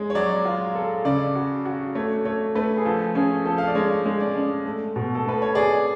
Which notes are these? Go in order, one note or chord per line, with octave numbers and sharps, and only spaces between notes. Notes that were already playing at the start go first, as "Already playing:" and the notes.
Already playing: G#3 C#5
C#5
F#3 D5
F4
A4
C#3 D5
F#4
F#4
A3 C#5
A3 C#5
A3 B4
G#4
F3 A4
C#4 G#4
F3 A4
F5
D5
G#3 C#5
G#3
D5
C#4
A3
B2
A4
A3 B4
C#5
G#4 D5